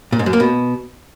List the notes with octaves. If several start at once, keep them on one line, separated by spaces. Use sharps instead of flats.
A#2
G#2
F#2
A#3
B2